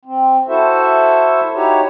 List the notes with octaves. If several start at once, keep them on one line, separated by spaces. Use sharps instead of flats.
C4
E4 F#4 A4 C5 E5
D#4 E4 F#4 G4 C#5